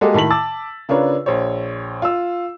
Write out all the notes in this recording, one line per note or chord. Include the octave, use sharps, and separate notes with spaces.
G#3 A#3 F#4 G4 A4 D#5
A2 D#3 A5 B6 F#7
A5 D6 E6 A6
C#3 D4 F4 A#4 B4 C#5
A#1 C5 C#5
F4 E6